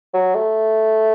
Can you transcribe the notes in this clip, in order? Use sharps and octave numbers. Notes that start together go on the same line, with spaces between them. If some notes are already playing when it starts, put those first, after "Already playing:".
F#3
A3